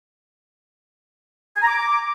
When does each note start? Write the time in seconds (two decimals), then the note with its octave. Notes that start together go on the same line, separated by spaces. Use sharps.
1.56 G#5
1.62 A#5
1.67 D6